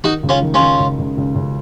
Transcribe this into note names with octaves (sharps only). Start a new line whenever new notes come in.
D#3 D#4 F#4
C#2
C#4 F4
D#3
C#4 F4
D#3
C#2
C#2
C#2
C#2